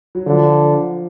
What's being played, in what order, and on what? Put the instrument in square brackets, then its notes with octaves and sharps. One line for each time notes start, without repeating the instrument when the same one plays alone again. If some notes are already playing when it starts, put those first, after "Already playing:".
[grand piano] F#3
[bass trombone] D3 [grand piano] F3